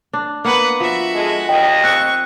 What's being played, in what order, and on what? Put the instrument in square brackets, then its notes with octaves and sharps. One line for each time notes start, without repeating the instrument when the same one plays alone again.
[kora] D4
[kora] A#3 B3 [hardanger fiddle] B4 F#5
[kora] F3 [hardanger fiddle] F#4 E5
[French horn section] G#3 A4
[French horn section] D#2 A#2 D#5 [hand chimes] G5
[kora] C4 [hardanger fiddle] C#6 [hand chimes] F#6